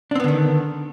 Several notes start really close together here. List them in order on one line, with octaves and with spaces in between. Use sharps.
D4 C4 B3 D3 D#3